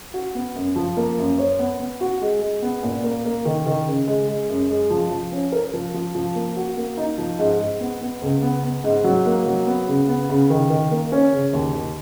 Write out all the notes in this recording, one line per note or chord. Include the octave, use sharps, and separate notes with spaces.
F#4
B3
F#2
F3
A#3
F#2
C#5
B3
B3
F#4
G#3
G#3
B3
A#2
A#3
A#3
D#3
D#3
C#3
G#3
G#3
F#2
G#3
F3
F3
C#4
A#4
F3
F3
F3
A#3
F#4
A#3
D#4
F3
G#2
G#2
B3
B3
C#2
B3
B3
G#2
F#3
A#3
F#3
B3
C#3
B3
C#3
D#3
D#3
A#3
C#4
C#3
D#2
D#2